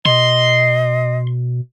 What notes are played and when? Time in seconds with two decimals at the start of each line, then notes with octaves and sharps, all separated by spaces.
0.05 B2 D#5 C6